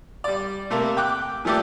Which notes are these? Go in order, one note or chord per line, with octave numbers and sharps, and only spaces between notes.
G3 D5
C3 A3 A#3
G5 D6 F#6
A#2 F3 A3 G4 D6